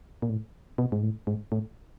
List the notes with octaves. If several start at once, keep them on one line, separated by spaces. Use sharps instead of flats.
A#2
A2
B2
G#2
A2
G#2
A2